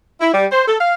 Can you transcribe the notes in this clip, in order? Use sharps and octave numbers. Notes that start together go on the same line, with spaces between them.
E4
G3
C5
A4
F5